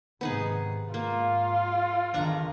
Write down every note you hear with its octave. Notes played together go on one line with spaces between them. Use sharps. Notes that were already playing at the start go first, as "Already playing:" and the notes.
G#2 C3 D#3 B3 D#4 G#4
G#2 A#3 F4
E2 D3 D#3 D4 A#5 C#6